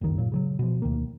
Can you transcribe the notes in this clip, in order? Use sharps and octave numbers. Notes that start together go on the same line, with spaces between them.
F#1 C#2 G2 D#3
A#2 F#3
C#3 F3 F#3
B2 F3
D2 D#3 A#3